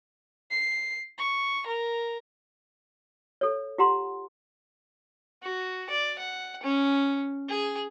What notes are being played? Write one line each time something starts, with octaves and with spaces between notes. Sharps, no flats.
C7
C#6
A#4
A4 C#5
F4 G4 F#5 A#5 C6
F#4
D5
F#5
C#4
G#4